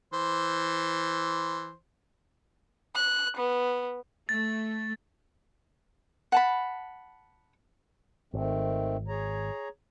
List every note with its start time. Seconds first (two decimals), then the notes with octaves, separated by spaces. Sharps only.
0.13 E3 C5
2.95 F#6
3.37 B3
4.29 A3 A6
6.32 F#5 A5 B5
8.34 G#1 D#3 A3 C4
9.08 G#4 C#5 A#5